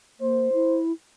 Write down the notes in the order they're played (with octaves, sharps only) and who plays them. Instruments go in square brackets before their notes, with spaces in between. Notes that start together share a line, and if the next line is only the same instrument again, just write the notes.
[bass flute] A#3 [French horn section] C5
[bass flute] E4